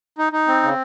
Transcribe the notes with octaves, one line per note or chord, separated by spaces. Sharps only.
D#4
D#4
C4
C#3